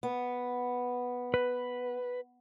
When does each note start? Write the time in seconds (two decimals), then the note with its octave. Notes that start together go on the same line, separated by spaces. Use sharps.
0.03 B3
1.34 B4